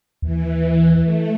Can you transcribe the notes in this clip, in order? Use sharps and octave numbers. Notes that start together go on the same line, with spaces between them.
D#2 E3
A3